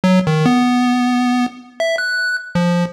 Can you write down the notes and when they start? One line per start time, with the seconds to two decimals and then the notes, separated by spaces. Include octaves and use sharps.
0.04 F#3
0.27 D#3
0.46 B3
1.80 E5
1.98 F#6
2.55 F3